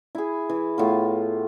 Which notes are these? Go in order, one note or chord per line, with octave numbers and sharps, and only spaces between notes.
E4 G#4
E3
A2 B3 F4